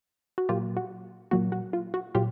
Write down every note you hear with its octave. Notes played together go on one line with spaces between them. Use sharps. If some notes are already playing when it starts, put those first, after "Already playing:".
F#4
A#2 F#3 A#3 F4 G4
F#4
A#2 F#3 A#3 F#4
F#4
F4
F#4
A#2 F#3 F4 G4